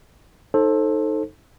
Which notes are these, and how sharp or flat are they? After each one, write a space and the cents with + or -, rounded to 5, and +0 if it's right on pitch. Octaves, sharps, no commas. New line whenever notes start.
D#4 +0 A4 +0 C5 +25